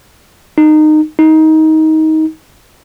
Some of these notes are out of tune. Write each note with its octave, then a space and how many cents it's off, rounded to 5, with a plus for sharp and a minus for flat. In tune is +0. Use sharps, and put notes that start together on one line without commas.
D#4 -20
D#4 +20